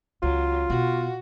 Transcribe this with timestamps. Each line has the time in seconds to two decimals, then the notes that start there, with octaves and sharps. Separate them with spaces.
0.23 C#2 F#3 F4
0.70 B2 F#4